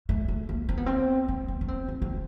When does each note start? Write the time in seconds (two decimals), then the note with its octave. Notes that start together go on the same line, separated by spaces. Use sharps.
0.09 A3
0.28 A3
0.49 A#3
0.69 C4
0.77 B3
0.86 C4
1.28 B3
1.48 C4
1.61 C#4
1.68 C4
1.88 B3
2.02 C4